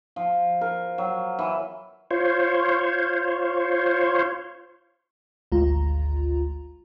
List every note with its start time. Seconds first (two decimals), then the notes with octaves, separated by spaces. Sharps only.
0.16 F3
0.61 A#4
0.98 F#3
1.39 E3
2.11 F4 C5 C#5
5.52 G#1 D2 G#3 F4 A#5